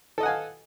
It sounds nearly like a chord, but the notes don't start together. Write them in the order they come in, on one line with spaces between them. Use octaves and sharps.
A4 D#5 F#5 G#5 F5